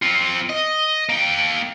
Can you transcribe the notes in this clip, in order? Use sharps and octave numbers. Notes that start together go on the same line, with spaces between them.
C4 F4
D#5
A#3 G5